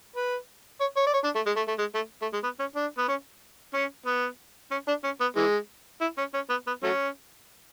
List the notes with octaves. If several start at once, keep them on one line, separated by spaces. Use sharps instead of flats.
B4
C#5
C#5
D5
C#5
D4
A3
G#3
A3
A3
G#3
A3
A3
G#3
B3
C#4
D4
B3
C#4
C#4
B3
C#4
D4
C#4
B3
E3 G#3
E4
C#4
C#4
B3
B3
F#3 A3 C#4